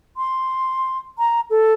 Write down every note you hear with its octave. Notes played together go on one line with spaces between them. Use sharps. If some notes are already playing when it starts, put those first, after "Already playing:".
C6
A#5
A4